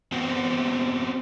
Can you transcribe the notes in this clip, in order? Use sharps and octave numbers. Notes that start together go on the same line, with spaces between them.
B3 C4 F#4 C5 F#5 G5